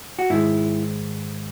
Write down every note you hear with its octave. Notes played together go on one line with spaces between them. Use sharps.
F#4
G#2 D#3 G#3 E4